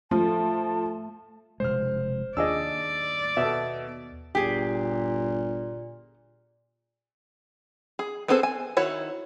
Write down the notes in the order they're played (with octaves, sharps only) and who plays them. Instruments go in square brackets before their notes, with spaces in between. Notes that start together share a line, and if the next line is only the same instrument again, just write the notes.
[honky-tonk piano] F3 [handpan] A3 [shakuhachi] A5
[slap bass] F1 B2 G#3 [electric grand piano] C5 F6
[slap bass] D#2 [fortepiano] D4 G#4 D#5 [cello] D5 [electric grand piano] E6
[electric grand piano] B2 [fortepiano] A4 E5
[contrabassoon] G1 [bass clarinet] A#2 [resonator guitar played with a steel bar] G4 G#4
[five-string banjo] G#4
B3 C4 G#4 A4 C5
G#5
D#3 E4 F#4 C#5